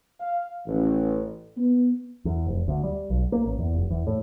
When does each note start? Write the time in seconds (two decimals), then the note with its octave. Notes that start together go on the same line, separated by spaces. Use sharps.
0.20 F5
0.66 A1
1.57 B3
2.25 E2
2.46 F1
2.68 D2
2.84 G3
3.10 B1
3.32 A#3
3.46 A1
3.59 E2
3.74 F1
3.90 E2
4.07 A2